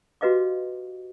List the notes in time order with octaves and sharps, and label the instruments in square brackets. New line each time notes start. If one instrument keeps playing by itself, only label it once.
[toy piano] F#4 G4 B4 D#5 F5 D6